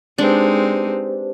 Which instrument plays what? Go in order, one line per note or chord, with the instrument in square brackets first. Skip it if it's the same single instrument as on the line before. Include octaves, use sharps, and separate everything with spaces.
[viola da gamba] G#3 C4 D#4 [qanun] D4 [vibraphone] G4 B4 C5